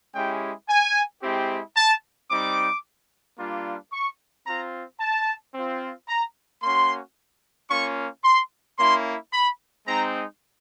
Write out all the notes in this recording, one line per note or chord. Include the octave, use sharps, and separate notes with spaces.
G#3 C#4 E4 G4 G5
G#5
G#3 C4 E4 G4
A5
G3 C4 D#4 D6
G3 A#3 D4 F4
C#6
C4 F4 A#5
A5
C4
F4
A#5
A#3 C#4 F#4 C6
A#3 C#4 F4 C#6
C6
A#3 C#4 E4 C6
B5
G#3 C4 D#4 A#5